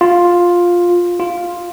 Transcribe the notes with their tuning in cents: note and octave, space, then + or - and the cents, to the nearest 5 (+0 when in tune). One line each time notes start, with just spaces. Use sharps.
F4 +5
F4 +0